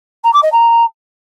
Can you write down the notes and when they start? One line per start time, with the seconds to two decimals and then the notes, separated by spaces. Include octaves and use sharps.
0.24 A#5
0.33 D6
0.42 D#5
0.52 A#5